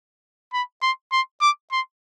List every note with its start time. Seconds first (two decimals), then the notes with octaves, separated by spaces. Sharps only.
0.53 B5
0.82 C6
1.12 C6
1.41 D6
1.72 C6